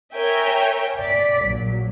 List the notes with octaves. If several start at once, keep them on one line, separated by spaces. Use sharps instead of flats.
A#4 C#5 E5 G5 G#5
D5 B6
A#1 F#3